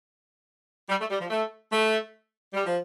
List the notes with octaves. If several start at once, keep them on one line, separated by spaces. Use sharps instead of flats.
G3
A3
G3
F3
A3
A3
G3
F3